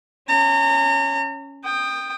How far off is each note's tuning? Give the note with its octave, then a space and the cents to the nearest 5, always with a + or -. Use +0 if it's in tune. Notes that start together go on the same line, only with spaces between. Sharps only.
C#4 +0 A#5 -35
G5 +10 D#6 -20